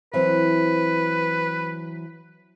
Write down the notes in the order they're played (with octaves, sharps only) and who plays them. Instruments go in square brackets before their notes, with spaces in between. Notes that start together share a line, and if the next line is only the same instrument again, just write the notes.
[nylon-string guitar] E3 F#3 C4 [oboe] B4